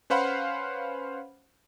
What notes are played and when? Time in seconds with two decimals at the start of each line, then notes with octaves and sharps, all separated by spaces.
0.10 C#4 B4 C5 F5 F#5 B5